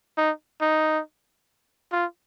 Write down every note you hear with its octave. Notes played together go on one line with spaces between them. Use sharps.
D#4
D#4
F4